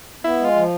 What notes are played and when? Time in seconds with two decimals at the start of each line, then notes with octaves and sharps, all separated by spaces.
0.23 B3 E4
0.39 G#3
0.45 F4
0.55 F3